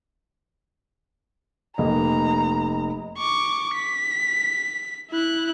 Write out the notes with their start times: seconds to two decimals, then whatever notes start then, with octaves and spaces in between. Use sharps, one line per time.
1.78 F1 A#3 D#5 A#5
3.18 C#6 D6
3.74 B6
5.11 E4 F#6